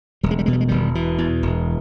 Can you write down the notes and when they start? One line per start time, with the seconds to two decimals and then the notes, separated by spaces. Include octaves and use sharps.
0.23 E1 G3
0.31 G#3
0.39 G3
0.46 B2 G#3
0.53 G3
0.61 G#3
0.68 E1 D#3 G3
0.95 B2 E3
1.18 E2
1.43 E1